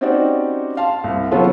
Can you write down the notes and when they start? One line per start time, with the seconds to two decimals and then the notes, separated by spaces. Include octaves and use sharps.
0.01 C4 C#4 D#4 F#4 G4 D5
0.77 F5 A5 C6
1.04 C2
1.31 C3 F#3 B3 C#4 F4 A4